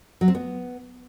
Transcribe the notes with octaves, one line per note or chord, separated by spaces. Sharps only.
F#3
C4
B3